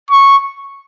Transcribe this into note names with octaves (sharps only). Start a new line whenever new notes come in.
C#6